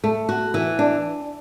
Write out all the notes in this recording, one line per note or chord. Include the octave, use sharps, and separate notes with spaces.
A3
F#4
E3
D4